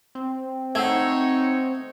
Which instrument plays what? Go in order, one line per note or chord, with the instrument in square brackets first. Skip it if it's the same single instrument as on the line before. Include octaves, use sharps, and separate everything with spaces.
[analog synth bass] C4
[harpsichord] A3 [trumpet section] D#4 C#5 [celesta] F#5 E6 G#6